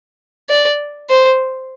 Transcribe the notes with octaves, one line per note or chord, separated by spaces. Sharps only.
D5
C5